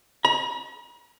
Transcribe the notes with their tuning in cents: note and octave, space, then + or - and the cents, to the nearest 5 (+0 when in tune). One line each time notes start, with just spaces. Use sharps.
A#5 +45